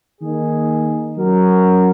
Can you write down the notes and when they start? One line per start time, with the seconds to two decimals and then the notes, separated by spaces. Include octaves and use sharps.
0.20 D#3 A#3 D#4 G#4
1.17 F#3 C#4 F#4 A#4